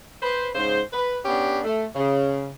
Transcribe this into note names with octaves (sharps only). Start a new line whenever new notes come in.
B4 C5
G#2 C#3 C5
B4
B3 C#4 D4 G4
A3
C#3